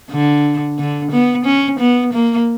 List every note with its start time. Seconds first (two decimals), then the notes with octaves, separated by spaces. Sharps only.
0.11 D3
0.79 D3
1.12 B3
1.45 C#4
1.80 B3
2.13 A#3